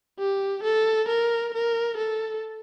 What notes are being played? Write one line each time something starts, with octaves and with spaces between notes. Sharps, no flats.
G4
A4
A#4
A#4
A4